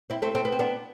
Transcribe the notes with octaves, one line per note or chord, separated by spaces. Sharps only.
C4 E4
A3 C4
A3 C4
B3
C4
B3 D4